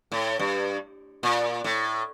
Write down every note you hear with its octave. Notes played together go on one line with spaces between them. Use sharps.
A2
G2
A#2
A2